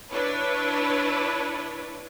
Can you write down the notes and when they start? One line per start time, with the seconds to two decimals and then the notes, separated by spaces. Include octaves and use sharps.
0.11 D4 E4 B4 C#5